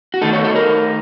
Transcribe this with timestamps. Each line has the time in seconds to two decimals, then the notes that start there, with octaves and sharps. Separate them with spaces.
0.14 F#4
0.21 D#3 A3 D#4 A4
0.33 C#5
0.44 A4
0.56 A#4